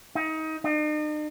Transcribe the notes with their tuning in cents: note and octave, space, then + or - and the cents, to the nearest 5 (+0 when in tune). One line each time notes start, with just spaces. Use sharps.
D#4 +25
D#4 -45